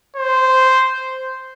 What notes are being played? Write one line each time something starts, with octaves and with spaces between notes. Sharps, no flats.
C5